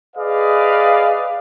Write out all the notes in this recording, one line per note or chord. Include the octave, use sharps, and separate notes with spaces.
G#4 B4 D5 D#5 F5